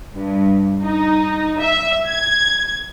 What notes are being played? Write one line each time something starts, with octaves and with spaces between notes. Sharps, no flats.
G2
D#4
E5
G#6